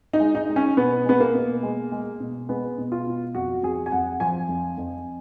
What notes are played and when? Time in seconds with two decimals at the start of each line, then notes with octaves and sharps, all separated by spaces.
0.13 D#4
0.20 G#3
0.35 D#4
0.49 G#3
0.56 C#4
0.77 B2 B3
1.06 G#3 B3
1.20 A#3
1.35 B2
1.63 G#3
1.92 G#3
2.20 B2
2.49 G#3 B3
2.78 B2
2.92 F4
3.07 B2
3.35 F2 F#4
3.63 F2 G#4
3.86 G#5
3.92 F2 F#5
4.20 F3 G#5
4.49 F2
4.78 F2